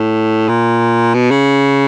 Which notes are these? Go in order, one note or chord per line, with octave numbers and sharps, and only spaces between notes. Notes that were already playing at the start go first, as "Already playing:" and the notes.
Already playing: A2
A#2
B2
C#3